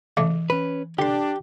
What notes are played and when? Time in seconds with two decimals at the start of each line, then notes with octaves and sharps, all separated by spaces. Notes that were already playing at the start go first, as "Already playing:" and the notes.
0.17 C#3 E3 G#3 A3
0.50 C#4 B4
0.99 D3 D4 G4 C6